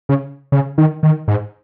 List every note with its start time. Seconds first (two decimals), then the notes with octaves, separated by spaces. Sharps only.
0.09 C#3
0.52 C#3
0.78 D#3
1.03 D#3
1.28 G#2